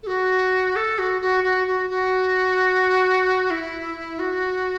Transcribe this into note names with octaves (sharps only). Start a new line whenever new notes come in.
A4
F#4
A4
F#4
F#4
F#4
F#4
F#4
E4
F#4